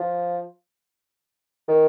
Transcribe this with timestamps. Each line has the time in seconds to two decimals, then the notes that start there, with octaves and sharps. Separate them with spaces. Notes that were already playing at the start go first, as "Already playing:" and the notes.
Already playing: F3
1.68 D#3